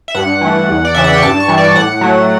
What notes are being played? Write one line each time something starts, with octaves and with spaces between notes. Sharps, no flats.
E5
G2 F#5
E3 A3
E2
D5
C#3 E3 E5
F#5
G5
G2 A5
C#6
E3 G3
D5
A2 F#5
F#3 A3